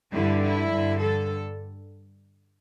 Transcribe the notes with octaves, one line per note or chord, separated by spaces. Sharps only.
G2 D3 G3 E4
E4
G2 D3 G3
A4